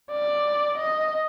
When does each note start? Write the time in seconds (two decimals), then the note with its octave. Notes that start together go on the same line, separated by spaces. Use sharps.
0.12 D5
0.78 D#5